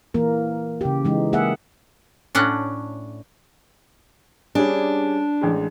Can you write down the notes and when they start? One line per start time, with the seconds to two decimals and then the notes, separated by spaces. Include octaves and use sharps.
0.14 E3 A#3 A#4
0.81 C#3 G4
1.05 E3 G#3 D#4
1.33 A#3 G#4 E5 F#5
2.35 A2 C#4 D4 F#5
4.55 G3 C#4 D4 G#4
5.41 A1 G#3